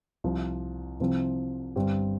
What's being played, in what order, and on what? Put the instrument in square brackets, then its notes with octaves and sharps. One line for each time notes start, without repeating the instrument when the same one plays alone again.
[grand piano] C2 C3 F3
C2 C3 F3 C4
G1 G2 G3 C4 G4